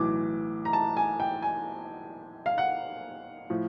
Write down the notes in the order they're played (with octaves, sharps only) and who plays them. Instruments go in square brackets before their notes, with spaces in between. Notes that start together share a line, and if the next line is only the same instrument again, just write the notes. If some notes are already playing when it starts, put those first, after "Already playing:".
Already playing: [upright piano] B1 A2 E3 D6
A#5
A5
G#5
G5
G#5
F5
F#5
A2 F3